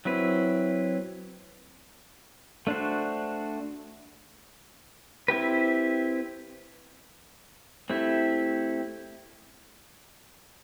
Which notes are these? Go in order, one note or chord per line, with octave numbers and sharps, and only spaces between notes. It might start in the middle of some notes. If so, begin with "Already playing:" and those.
F#3 C4 E4 B4
A3 D4 F#4 C5
C4 E4 G4 B4
A3 C4 E4 G4